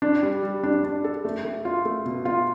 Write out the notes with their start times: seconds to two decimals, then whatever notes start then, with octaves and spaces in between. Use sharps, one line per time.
0.02 D4
0.23 G3
0.43 G3
0.63 D4
0.84 D4
1.04 A4
1.25 A3
1.45 A3
1.65 F4
1.85 A3
2.06 B2
2.25 F4